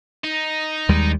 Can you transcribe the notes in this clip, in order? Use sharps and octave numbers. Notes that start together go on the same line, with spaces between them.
D#4
D#2 G3 G#3